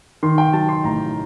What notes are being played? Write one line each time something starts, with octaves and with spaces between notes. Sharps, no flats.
D#3 C6
G5
F#3 A5
C6
A1 A#5